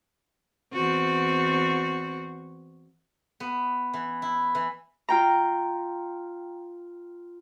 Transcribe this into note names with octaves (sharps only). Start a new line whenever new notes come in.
E2 C4 F#4
B3
E3
E4
E3
F4 G5 A#5